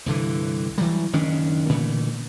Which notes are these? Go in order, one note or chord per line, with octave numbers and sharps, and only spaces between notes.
C2 G2 D3 E3
E3 F#3 G3
F#1 D#3 C#4 D4
A#2 D3 E3 A3